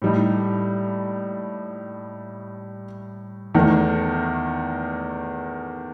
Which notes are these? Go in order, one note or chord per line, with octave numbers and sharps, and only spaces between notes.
A2 G3 D#4
E2 D#3 A3